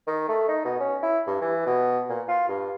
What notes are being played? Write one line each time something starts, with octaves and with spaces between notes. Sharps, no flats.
D#3
A3
D#4
B2
C#4
E4
G2
E3
B2
A#2
F4
G2